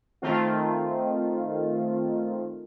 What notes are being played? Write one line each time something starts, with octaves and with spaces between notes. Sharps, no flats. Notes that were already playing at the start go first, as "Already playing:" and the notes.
D#3 A3 C4 F4